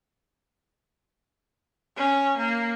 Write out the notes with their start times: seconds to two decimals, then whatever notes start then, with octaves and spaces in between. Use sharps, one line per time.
1.97 C#4
2.38 A#3